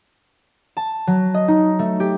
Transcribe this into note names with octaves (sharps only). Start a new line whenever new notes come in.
A5
F#3
D#5
D#4
A3
G4